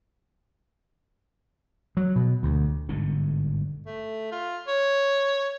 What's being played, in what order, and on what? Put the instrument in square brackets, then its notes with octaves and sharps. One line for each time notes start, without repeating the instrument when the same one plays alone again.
[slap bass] F#3
B2
D2
G1 G#2 B2 D3
[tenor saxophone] A3
F4
C#5